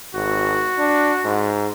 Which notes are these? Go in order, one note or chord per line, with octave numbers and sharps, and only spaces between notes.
G#1 F#4
D4
G#2